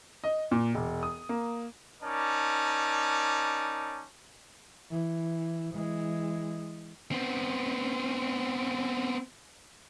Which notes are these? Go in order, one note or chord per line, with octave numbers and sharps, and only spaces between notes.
D#5
A#2
E1
D#6
A#3
C#4 D#4 A#4 D5 A5
E3
E3 G#3
B3 C4